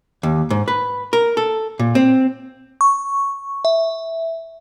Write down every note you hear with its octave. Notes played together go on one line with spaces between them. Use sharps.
D#2
G#2
B4
A#4
A4
A#2
C4
C#6
E5